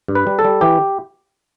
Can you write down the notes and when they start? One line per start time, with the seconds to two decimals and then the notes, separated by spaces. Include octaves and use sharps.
0.08 G2
0.15 B4
0.27 G3
0.39 A4
0.45 G3
0.61 E3 G4